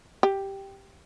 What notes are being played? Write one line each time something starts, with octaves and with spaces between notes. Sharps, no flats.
G4